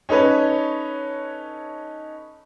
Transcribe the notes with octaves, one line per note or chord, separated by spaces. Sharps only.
C#4 D#4 A4 B4 C#5